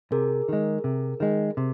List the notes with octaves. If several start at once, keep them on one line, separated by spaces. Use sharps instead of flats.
C3 G#4 A#4
D#3 G#3
C3
D#3 G#3
C3